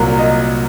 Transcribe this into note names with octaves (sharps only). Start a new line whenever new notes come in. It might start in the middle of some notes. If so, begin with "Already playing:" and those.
Already playing: C2 A#2 F#3 A#4
D#5